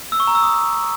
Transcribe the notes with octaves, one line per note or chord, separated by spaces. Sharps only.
E6
C#6
A#5
E6
D#6